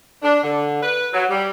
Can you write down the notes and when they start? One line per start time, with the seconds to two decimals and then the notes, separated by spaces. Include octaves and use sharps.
0.22 D4
0.41 D3
0.81 B4
1.12 F#3
1.28 G3